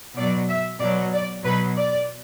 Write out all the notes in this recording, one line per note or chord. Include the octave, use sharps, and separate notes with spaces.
B2 F#3 D5
E5
B2 F#3 D5
D5
B2 F#3 B4
D5